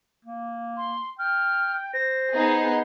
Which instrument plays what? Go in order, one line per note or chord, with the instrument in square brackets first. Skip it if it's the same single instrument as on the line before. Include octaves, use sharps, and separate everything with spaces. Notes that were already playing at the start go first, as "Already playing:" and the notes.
[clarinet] A#3
[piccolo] C6
[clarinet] G5 [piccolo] F6
[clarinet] C5 [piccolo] A#6
[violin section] B3 D#4 G#4